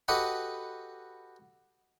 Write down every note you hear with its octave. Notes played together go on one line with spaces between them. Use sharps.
F#4 G4 A4 B4 D#5 F#5